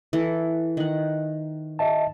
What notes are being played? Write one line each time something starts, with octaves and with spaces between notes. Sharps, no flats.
E3 A4
D#3 F#5
D#5 E5 A5